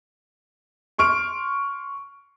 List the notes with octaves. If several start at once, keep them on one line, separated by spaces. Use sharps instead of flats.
C6 C#6 F6 D7